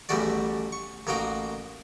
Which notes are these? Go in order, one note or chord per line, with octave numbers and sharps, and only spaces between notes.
A1 E2 G3 A3 F#4 D5
C#6
A1 A#3 D#4 F#4 G5